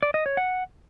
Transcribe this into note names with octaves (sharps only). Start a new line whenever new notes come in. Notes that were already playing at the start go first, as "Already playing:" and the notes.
D5
D#5
C#5
F#5